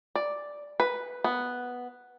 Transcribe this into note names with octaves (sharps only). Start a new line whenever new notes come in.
D5
B4
B3